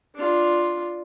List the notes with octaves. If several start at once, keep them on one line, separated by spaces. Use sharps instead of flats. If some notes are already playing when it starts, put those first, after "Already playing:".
D4 F4